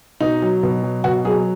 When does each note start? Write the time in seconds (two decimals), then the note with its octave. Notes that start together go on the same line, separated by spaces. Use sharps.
0.20 B2 D#4
0.42 F#3
0.63 B2
0.83 F#3
1.04 B2 F#4
1.25 F#3 G#4